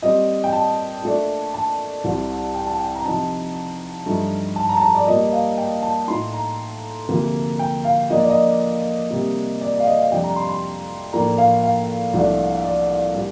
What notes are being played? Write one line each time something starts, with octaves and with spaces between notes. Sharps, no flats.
A#2 G3 C4 D#5
G5
A5
A#2 A3 D4
A5
C2 C3 G3 C4
G5
A5
G5
A#5
C3 F3 C4 D#4 A5
G2 F3 A3 D#4
A5
A#5
A5
A#5
D5
A#2 G3 A#3 D#5
F5
G5
A5
A2 A3 D#4 C6
A#5
D2 C3 F3 A#3
G5
F5
A#2 F3 A#3 D4 D#5
D5
D#5
C3 G3 A#3
D5
D5
F5
D#5
F5
F2 C3 G3 D4 G5
A#5
C6
C6
A2 F3 A#3 D4 A#5
F5
F5
C2 A#2 F3 A3 D4
D5
A#2 G3 D4